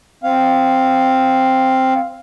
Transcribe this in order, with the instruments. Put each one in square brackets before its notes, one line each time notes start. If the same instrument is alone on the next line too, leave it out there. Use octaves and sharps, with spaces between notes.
[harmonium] C4 F5